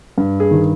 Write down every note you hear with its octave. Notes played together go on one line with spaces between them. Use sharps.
G2
G#4
D#3